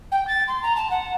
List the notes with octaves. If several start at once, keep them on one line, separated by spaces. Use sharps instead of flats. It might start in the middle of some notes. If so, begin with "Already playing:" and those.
G5
A6
C6
A#5
A5
F#5